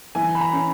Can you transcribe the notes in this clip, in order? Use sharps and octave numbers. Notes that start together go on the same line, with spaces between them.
E3 G#5
B5
A#5
C#4